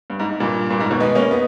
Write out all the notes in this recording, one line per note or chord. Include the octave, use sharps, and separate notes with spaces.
G2
G#2
G#2
G2 A#2
G2 A#2
G#2
B2 D#3
G#3 B3
A#3 C#4
B3 D#4